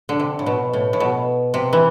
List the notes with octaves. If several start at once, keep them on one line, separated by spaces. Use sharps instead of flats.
D3
C3
A2
B2
A2
A2
B2
C3
E3